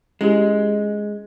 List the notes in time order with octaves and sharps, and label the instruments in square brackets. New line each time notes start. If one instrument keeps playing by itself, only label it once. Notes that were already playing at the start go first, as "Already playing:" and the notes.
[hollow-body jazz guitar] G#3 [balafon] C#4 E4 G4